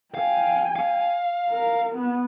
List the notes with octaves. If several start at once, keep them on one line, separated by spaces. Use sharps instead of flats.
F5 G5 G#5
F5
A#4
B3